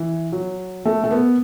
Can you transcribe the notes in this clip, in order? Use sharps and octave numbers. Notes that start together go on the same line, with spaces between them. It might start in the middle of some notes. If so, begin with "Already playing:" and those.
Already playing: E3
F#3
A3
A3
B3